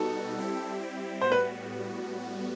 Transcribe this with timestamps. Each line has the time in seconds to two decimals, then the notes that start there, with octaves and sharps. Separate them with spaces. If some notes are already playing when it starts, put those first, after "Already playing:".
Already playing: B2 G3 B3 D#4 F#4 A4
0.37 G3 C4 E4 G4
1.21 A2 G3 B3 F#4 C5
1.32 B4